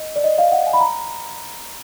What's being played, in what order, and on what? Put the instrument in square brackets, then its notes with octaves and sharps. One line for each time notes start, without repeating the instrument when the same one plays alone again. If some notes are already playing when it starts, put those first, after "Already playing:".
Already playing: [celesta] D#5
D5
D#5
F5
F#5
G#5
B5
A#5